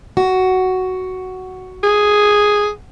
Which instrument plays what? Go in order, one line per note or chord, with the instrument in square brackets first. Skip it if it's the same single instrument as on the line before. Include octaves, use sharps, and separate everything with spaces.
[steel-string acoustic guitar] F#4
[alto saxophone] G#4